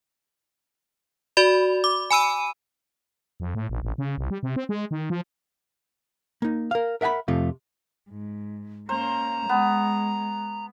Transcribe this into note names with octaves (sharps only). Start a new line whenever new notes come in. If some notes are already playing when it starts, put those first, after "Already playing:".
F#4 D5 B5
D6
G#5 B5 E6 D#7
F2
A2
A#1
A1
C#3
C2
G3
C3
C4
G#3
D#3
F3
A#3 D#4
A#4 F5
A#4 E5 F#5 G#5 B5
F2 C3 A3 F4
G#2
A#3 C#4 C5 A#5
G#3 B3